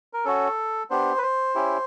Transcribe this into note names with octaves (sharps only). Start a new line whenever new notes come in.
A#4
C#4 F#4 A4
B3 D4 G4 C5
B4
C5
C#4 E4 G4